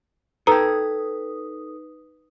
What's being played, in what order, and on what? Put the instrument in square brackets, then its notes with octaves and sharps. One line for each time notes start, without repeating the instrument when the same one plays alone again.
[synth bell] D#4 B4 D#6 [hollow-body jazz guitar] A4 G5 [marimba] A#5